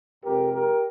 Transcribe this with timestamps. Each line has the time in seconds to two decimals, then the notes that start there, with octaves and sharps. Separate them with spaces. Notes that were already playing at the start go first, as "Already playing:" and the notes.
0.24 F2 C3 F3 G#3 G4 A#4
0.53 G4 A#4